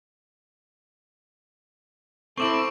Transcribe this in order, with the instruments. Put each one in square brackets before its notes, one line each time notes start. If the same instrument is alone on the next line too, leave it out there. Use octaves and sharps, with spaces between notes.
[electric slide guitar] C4 E4 [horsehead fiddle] A4 C5 [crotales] C#6 D6 D7